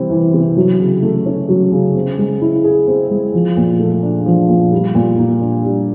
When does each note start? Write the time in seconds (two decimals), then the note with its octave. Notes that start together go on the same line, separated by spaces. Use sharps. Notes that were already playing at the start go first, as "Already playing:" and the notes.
Already playing: C3 E3 G3 C4
0.10 E3
0.33 C3
0.56 F#3
0.79 C#3
1.03 A3
1.26 C#4
1.49 F#3
1.72 C#3
1.95 C4
2.18 G#3
2.41 E4
2.64 G#4
2.87 C4
3.10 G#3
3.34 F3
3.57 A#2
3.79 A3
4.03 D4
4.26 F3
4.49 A#2
4.72 G3
4.95 A#2
5.18 A#3
5.41 D4
5.65 G3